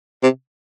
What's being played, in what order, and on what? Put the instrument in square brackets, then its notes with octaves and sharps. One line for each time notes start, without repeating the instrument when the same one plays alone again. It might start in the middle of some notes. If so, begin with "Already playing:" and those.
[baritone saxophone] C3